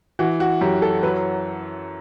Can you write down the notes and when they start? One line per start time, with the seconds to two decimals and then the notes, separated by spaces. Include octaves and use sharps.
0.19 E3 F#4
0.40 F#4
0.61 F#2 G4
0.82 A4
1.03 F#3 B4